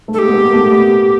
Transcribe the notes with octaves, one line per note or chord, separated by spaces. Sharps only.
A3
G#3 G4 A4
B3
G#3 A#3
A3 B3